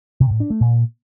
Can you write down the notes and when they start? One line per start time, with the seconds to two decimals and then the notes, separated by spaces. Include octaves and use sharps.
0.20 C3
0.30 A2
0.40 D4
0.50 A3
0.60 A#2